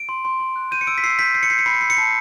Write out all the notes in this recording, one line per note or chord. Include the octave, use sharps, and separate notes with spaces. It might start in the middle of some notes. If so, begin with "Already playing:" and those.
Already playing: D7
C6
C6
C6
F#6
G6 D#7
C#7
E6 D7
B6
E6 C7
G6 B6
G6 C7
C#7
G6 C7
C#7
B5 C7
C#7
E6 C7
C#7
A5 C7